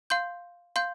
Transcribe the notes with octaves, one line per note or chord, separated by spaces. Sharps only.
F5 C6 G6
F5 C6 G6